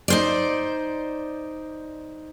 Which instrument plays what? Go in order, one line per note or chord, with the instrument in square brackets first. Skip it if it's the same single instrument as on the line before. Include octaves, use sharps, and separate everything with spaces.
[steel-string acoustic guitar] D#4 C5 D5